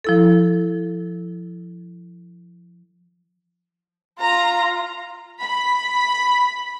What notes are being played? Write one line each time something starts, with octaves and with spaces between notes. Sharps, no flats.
F3 E4 A4
F4 A#5
B5